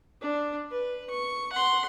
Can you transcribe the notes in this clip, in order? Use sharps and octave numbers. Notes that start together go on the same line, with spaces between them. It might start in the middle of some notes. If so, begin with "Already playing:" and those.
D4
B4
C#6
F#5 C6